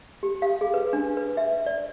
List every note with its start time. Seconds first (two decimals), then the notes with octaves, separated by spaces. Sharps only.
0.23 G4
0.42 F5
0.61 G#4
0.74 B4
0.93 D4
1.17 B4
1.37 E5
1.66 D5